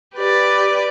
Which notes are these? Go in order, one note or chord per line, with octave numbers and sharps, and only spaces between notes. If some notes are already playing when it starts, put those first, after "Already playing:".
G4 B4 D5